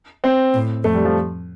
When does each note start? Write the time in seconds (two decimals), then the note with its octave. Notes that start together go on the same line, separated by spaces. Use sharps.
0.24 C4
0.54 A2
0.84 F2 A3
0.94 G3
1.05 F3